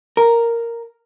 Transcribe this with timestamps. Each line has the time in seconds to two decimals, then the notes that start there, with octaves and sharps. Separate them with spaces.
0.17 A#4